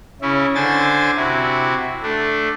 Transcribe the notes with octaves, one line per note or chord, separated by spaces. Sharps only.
C#3 C#4 E4
D3 D4 C5 G#5 A6
C3 E4 F#4
A3 D4